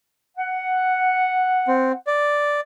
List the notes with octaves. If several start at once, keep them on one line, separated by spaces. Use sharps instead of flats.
F#5
C4
D5